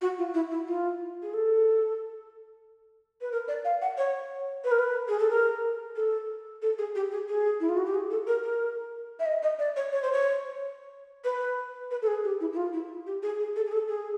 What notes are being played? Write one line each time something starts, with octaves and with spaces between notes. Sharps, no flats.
F#4
F4
E4
E4
F4
G#4
A4
B4
A#4
D5
F5
F#5
C#5
B4
A#4
B4
G#4
A4
A#4
A4
A4
G#4
G4
G#4
G#4
E4
F4
F#4
G4
G#4
A4
A#4
A#4
E5
D#5
D#5
D5
C#5
C#5
C5
C#5
B4
B4
A4
G#4
G4
E4
E4
F4
E4
G4
G#4
G#4
A4
G#4
A4
G#4